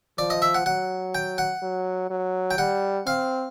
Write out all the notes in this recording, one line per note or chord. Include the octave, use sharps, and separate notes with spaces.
F3 D5
D#5
E5
F#5
F#3 F#5
G5
F#5
F#3
F#3
G5
G3 F#5
C4 F5